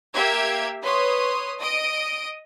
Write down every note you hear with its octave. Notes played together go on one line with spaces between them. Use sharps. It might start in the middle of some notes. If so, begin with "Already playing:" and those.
A#3 G4 E5 G#6
B4 C#5 C6 D#6
D#5 D#6 D7